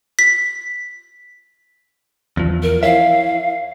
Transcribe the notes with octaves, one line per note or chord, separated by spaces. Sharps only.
B6
E2 F3
A#4
E4 C#5 E5 F5